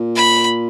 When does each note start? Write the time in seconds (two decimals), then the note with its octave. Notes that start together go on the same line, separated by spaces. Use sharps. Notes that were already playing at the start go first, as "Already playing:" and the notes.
Already playing: A#2
0.16 B5